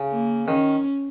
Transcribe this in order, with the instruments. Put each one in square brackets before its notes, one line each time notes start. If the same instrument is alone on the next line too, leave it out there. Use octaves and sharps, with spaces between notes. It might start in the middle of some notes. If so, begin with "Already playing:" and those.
Already playing: [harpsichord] C#3
[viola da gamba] A#3
[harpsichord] D#3 [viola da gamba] C#4